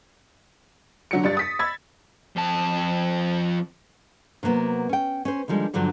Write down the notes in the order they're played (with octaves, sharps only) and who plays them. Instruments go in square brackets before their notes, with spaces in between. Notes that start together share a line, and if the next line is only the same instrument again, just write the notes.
[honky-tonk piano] D3 F#3 C#7
G2 D4 A6
D#6 B6
B5 E6 G#6 A6
[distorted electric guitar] F2 A5
[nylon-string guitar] C3 F#3 A#3 B3
C#4 G5
C#4 C5
D3 D#3 F3 G3 G#3
E2 G2 D3 F3 F#3